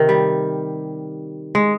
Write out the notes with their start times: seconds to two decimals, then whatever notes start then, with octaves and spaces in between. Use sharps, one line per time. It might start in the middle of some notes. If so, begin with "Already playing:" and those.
Already playing: C3 D#3
0.09 G3
1.55 G#3